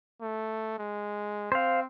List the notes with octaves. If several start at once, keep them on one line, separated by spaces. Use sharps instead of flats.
A3
G#3
C4 C5 F5